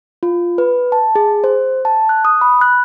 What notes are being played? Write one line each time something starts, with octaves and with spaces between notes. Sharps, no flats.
F4
B4
A5
G#4
C5
A5
F#6
D#6
B5
F#6